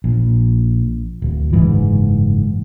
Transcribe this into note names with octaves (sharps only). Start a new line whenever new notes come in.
A#1
D1
F#1 G#2 E3